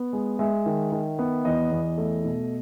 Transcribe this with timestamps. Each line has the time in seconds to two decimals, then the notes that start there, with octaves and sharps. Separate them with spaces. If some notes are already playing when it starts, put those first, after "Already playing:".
Already playing: B3
0.13 G#3
0.39 G#3 E5
0.66 D#3
0.92 D#3
1.19 B3
1.45 E2 D#5
1.71 E2
1.98 A3
2.24 B2